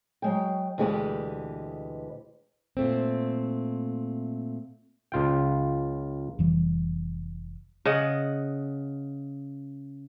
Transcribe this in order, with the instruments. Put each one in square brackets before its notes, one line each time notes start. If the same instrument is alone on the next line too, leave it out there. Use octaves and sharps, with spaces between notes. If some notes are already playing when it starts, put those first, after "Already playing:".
[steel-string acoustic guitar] F#3 G#3 G5
D2 B2 E3 G#3 G4 B4
A#2 A3 C4
[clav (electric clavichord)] C#2 F4 G5
[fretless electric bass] F1 E3 G3
[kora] C#3 D#5 F#5